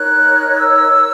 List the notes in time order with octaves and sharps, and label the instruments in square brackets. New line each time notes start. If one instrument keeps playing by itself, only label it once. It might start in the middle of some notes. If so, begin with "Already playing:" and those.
Already playing: [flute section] D#4 A#4 C#5 F#6
E6